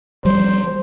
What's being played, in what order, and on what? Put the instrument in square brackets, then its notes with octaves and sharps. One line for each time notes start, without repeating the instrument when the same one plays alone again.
[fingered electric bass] F3 G3 [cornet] C5